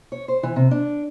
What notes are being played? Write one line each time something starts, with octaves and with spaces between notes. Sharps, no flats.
C#5
C5
E3
C3
D4